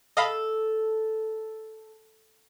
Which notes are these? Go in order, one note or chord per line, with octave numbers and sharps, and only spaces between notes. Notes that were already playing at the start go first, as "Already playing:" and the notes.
A4 D#5 F5 B5